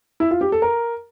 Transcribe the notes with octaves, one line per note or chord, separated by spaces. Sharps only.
E4
F4
G4
A4
A#4